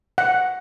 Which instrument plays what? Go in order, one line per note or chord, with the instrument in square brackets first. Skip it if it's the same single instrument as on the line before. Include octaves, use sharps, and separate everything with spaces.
[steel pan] F#5